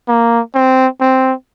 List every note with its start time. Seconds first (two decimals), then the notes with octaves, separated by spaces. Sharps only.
0.08 A#3
0.55 C4
1.01 C4